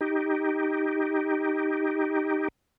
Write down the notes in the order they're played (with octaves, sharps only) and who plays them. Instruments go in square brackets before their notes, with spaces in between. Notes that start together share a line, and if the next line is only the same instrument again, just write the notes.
[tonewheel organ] D#4 G4